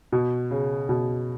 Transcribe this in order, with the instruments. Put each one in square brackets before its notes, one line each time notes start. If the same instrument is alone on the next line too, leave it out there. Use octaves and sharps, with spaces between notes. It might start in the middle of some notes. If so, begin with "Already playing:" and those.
[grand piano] B2
C#3
B2